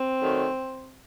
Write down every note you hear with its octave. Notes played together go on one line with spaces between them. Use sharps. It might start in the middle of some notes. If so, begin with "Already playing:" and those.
Already playing: C4
D#3 F#3 A3